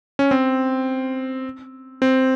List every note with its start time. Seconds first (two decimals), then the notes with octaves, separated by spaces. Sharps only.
0.19 C#4
0.31 C4
2.02 C4